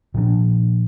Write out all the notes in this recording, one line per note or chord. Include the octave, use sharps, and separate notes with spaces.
A#2 F3 D4